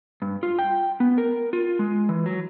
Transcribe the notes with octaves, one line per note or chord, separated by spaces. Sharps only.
G2
F4
G5
B3
A#4
F4
G#3
E3
F#3